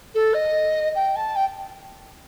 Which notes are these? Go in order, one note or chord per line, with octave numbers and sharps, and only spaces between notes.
A4
D#5
G5
A5
G5